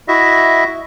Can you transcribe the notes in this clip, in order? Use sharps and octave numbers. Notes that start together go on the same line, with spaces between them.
E4 F#4 D#5 E5